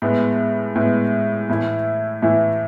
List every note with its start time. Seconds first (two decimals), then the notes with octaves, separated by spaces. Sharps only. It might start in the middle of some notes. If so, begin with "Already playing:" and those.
0.02 A2 G#3 B3
0.75 A2 G#3 B3
1.49 A2 E3 A3 E4
2.22 A2 E3 A3 E4